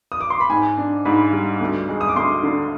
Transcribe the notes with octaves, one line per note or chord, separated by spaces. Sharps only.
D#6
D6
C6
B5
G#2 G#5
D4
G#2 B5
G3
D2
G#3
D#6
D6
D2 C6
D3